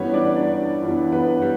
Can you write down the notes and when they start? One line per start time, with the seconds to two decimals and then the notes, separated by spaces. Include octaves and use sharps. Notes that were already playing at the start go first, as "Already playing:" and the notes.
Already playing: G2 E3 G3 B3 C#4 C#5
0.13 D4 D5
0.36 D4 D5
0.82 G2 E3 G3 B3
1.12 B3 B4
1.42 G3